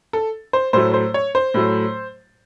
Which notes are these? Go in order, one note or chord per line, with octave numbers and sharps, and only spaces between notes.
A4
C5
A2 F#3 A3 C5
C5
C#5
C5
A2 F#3 A3